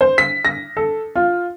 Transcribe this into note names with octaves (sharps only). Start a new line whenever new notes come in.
C5
B6
A#6
A4
F4